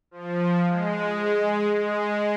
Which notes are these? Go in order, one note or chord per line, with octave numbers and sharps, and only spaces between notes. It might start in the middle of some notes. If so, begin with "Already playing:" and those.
F3
G#3
G#3